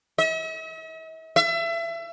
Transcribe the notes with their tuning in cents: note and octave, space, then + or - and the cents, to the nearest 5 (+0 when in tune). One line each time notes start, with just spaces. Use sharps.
E5 -45
E5 +30